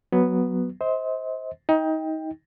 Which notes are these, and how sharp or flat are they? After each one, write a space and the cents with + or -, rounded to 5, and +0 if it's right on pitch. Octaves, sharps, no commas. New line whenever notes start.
F#3 +0 B3 +0
C5 +0 D#5 +40
D#4 +25 G5 +15